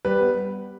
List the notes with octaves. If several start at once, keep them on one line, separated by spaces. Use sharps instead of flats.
G3 B4
B3